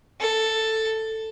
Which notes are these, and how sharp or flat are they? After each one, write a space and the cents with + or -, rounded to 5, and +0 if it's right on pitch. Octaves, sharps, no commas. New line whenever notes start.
A4 +5